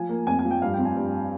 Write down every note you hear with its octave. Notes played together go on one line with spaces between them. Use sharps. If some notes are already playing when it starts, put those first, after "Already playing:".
Already playing: F3 G#5
A#3
F2 G#5
G#5
F3
G5
G2 F5
G5
C4
G#5
G2